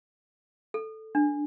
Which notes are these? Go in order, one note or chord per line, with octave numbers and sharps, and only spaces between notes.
A4
D4